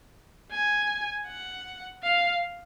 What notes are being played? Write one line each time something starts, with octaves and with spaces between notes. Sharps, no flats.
G#5
F#5
F5